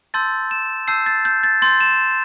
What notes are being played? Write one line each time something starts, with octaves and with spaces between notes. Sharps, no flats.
A5 C6 E6 G6 A6
E7
A5 E6 G6 C7
A6
G6
A6
C6 G6 A6
E7